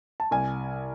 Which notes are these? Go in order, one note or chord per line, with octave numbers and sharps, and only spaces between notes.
A5
C2 G#5